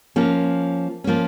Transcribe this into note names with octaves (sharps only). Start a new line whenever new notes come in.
F3 A#3 C#4
F3 A#3 C#4